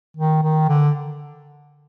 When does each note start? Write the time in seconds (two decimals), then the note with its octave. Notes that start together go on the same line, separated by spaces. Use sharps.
0.17 D#3
0.43 D#3
0.69 D3